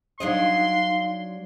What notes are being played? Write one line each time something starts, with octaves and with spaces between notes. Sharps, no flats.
F#3 D4 D#4 D#5 F5 C6